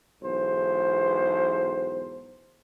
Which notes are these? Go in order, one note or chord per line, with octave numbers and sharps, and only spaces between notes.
B1 E2 G#2 C5